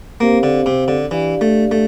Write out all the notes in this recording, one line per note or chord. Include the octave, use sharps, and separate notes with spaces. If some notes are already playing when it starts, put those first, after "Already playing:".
A#3 C4 G4 C5 F5
D3
C3
D3
E3 D4 G4 D5 F5
A3
A3